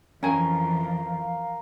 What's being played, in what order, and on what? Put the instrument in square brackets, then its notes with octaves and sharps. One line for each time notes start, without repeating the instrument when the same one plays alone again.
[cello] F2 E3 [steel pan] C#4 G#5 [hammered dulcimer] A#4 G5 C#6 [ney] F5